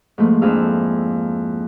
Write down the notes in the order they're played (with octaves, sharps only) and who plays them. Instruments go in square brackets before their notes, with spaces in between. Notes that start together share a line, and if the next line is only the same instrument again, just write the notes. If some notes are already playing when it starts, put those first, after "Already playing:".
[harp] G#2 F3 A3 A#3 F#6
F2 D4 E4 G#4 F5 E6